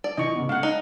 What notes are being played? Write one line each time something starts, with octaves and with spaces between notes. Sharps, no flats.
D5
A#2 E3 D#5 C#6
C#3 B3
G#3 A4 F5 F#5
D#4